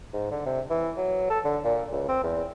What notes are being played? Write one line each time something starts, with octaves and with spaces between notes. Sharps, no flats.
G#2
D3
C3
E3
F#3
A4
D3
A#2
C#2
C4
E2